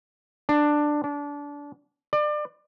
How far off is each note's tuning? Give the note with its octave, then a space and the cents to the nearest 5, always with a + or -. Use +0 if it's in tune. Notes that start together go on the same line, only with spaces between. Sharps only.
D4 +10
D4 -25
D5 +30